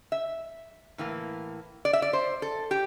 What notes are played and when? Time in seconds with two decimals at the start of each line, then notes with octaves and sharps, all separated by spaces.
0.12 E5
0.98 A2 E3 A#3
1.85 D5
1.93 E5
2.02 D5
2.13 C5
2.42 A4
2.71 G4